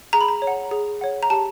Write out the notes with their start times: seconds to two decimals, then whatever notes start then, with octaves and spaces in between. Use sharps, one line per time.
0.13 G#4 A#5
0.21 B5
0.28 A#5
0.42 C#5
0.47 F#5
0.71 G#4
1.01 C#5 F#5
1.23 A#5
1.30 G4 A5